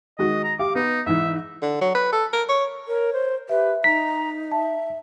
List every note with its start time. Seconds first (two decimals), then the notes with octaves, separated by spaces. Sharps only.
0.19 D#3 G#3 F#4 D#5
0.44 A#5
0.59 G4 F5 D6
0.75 B3 D#4
1.06 G#2 E3 E5
1.62 D3
1.81 F#3
1.95 B4
2.13 A4
2.33 A#4
2.49 C#5
2.88 A#4 C#5
3.13 C5
3.49 G4 B4 E5
3.84 D#4 A#5 B6
4.52 E5 A5